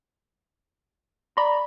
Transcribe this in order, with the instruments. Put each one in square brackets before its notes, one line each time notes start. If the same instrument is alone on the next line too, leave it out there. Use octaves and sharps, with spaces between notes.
[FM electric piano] D5 A#5 [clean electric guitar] B5